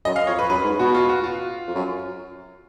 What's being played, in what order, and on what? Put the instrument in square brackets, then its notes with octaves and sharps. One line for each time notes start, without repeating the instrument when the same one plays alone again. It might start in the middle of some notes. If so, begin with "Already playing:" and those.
[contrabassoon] F#2 [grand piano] D#5
[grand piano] F5
[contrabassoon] F2 [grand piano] C#5
[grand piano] B4
[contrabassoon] F#2 [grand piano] B4
[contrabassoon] G#2
[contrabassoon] B2 [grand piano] F#4
[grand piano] F4
F#4
F4
[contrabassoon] F2
F#2